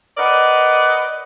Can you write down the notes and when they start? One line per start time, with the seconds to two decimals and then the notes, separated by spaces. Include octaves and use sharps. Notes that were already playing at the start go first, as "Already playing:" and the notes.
0.17 A#4 B4 D5 D#5 F#5